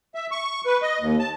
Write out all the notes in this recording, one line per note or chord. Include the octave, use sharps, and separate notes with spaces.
E5
C#6
B4
D#5
D#2
A5